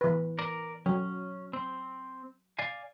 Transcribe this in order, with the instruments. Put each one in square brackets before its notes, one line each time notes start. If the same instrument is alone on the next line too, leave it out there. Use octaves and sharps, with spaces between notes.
[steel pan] E3 B4
[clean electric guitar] A#4 D5
[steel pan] F#3 [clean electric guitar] C#4
[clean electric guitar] C4
D5 F5 G#5